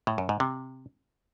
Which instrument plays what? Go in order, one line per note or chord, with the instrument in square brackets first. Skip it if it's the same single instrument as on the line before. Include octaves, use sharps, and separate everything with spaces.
[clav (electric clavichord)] A2
F#2
G#2
C3